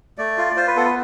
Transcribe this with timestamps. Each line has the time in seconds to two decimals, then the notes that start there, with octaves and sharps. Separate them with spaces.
0.18 A3 D5
0.38 F4
0.56 F4 C5
0.67 B4
0.76 B3 A4
0.85 B4